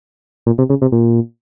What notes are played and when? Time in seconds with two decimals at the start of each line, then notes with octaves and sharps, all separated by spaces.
0.46 A#2
0.58 C3
0.70 C#3
0.82 C3
0.92 A#2